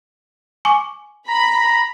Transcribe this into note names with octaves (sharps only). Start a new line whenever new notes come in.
G#5 C#6 D6
A#5 B5